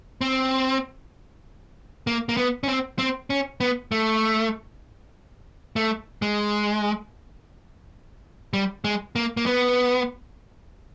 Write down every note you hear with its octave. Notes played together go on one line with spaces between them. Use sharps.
C4
A#3
A#3
B3
C#4
C4
C4
C#4
B3
A3
A3
G#3
G3
G#3
A#3
A#3
B3